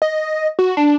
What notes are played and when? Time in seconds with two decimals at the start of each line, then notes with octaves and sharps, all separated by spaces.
0.02 D#5
0.59 F#4
0.77 D4